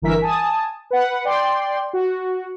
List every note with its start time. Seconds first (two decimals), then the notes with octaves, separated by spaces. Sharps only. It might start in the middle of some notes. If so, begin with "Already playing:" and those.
0.02 G1 E3 A#4 E5 B6
0.22 G#5 A5 D#6
0.91 B4 F#5
1.25 D5 G5 C6
1.93 F#4